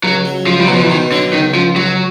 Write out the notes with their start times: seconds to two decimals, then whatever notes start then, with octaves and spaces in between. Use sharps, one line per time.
0.03 C#2 F#3
0.25 F#3
0.46 C#2 F3
0.60 G3
0.67 B2 F#3
0.74 F3
0.82 E3
0.90 B2 D#3
1.11 D3 F#3
1.33 C#2 D#3
1.54 C#2 F3
1.76 C#2 F#3